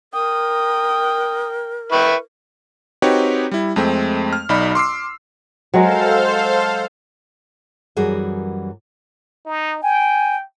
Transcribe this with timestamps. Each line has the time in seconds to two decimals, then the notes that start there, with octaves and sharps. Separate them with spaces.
0.14 A#4 G5 D#6
1.92 E4 B4 G5 C#6
3.02 C4 D#4 F#4 G4 B4 C#5
3.51 G3 E4
3.76 F2 G#3 A3 C4
4.33 F6
4.49 B1 D#4 D5 B5
4.75 C6 D6 E6 C7
5.74 F#3 G#3 A4 A#4 C5 F5
7.97 F#2 E3 G3 F#4 G#4 A#4
9.46 D#4
9.83 G5 G#5